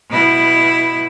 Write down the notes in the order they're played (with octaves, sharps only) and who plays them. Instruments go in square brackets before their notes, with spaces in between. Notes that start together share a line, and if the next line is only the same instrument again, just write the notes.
[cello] B2 E4